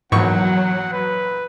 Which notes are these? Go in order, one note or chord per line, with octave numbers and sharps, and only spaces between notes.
A#1 E2 G#2 F#3 F#5 C#6
B4